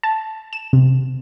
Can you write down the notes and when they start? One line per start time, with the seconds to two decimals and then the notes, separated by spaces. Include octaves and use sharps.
0.03 A5
0.53 E7
0.73 C3